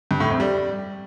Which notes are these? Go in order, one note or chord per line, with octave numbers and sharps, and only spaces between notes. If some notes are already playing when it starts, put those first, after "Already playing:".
G2
A2
F2
G3